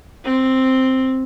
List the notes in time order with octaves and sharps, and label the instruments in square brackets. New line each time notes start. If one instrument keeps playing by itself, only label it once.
[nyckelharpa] C4